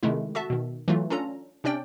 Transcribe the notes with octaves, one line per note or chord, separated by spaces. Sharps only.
C3 D#3 G#3 A3 E4
F#4 A4 E5 A5
B2 D#3
E3 F#3 A3 F4
C#4 D4 F4 A4 A#5
C3 C#4 D4 D5 G5